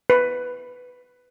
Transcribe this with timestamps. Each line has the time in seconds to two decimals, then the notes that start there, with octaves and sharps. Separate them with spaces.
0.10 B4